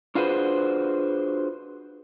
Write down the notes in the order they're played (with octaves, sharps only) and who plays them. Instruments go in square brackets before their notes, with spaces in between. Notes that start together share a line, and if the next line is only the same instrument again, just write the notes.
[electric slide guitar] D4 F4 F#4 G#4 B4 C5